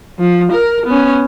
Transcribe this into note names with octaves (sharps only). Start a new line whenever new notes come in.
F3
A#4
B3 C#4